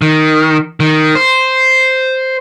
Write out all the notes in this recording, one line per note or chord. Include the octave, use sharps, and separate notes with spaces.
D#3
D#3
C5